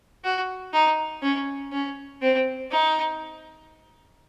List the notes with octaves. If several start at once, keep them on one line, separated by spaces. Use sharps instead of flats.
F#4
D#4
C#4
C#4
C4
D#4